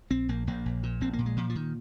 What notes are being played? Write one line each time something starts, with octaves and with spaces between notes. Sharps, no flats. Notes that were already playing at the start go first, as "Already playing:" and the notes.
A#1 C4
A#1 A#3
A#1 A#3
A#1
A#2
A#1 C4
A#3
A#2
G#3
A#2 F3
F3
A#2 D#3